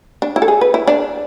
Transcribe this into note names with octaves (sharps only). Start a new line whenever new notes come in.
D4
E4
A4
G#4
B4
E4
D4